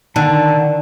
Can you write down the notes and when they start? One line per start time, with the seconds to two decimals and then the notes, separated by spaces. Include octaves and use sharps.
0.16 D3 D#3 A5